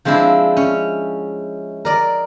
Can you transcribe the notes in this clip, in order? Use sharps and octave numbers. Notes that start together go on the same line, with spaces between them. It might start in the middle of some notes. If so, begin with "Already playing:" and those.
F3 G#3 C4 D4 E4
C#4
A#4 D5 D#5